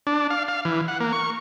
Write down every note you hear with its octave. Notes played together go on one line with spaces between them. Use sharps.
D4
F5
F5
E3
F#5
A#3
C#6